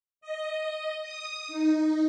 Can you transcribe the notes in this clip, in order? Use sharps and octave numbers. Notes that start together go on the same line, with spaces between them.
D#5
D#6
D#4